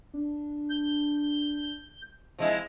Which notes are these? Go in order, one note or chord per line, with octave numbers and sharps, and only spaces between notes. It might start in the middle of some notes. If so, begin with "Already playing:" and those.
D4
G6
C3 F3 G#3 E4